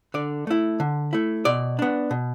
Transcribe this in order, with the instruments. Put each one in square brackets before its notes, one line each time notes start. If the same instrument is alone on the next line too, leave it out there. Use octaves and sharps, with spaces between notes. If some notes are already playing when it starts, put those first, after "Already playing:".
[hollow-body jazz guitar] D3 D5
A3 E4
D3
A3 E4
B2 D5
B3 D4
B2